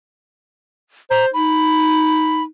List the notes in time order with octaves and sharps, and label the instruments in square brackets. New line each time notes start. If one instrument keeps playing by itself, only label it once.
[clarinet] C5 [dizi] A#5
[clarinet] D#4 [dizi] B5